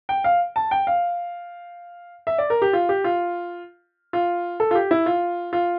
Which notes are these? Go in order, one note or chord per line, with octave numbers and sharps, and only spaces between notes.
G5
F5
A5
G5
F5
E5
D5
A#4
G4
F4
G4
F4
F4
A4
F4
G4
E4
F4
F4